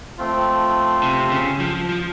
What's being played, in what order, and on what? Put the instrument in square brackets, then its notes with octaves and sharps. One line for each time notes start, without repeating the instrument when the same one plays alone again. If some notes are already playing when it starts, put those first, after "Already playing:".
[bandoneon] F3 A3 C4 F4
[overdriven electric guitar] C3
C#3
F3
F3